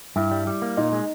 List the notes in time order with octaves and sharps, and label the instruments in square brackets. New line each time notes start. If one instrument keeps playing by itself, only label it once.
[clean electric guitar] G2 [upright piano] E4
[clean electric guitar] G3
G3
A#3
[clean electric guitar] A#2 [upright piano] D#4
[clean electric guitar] G#3